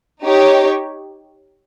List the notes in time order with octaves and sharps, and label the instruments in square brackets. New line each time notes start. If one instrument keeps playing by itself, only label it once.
[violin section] D#4 G4 C#5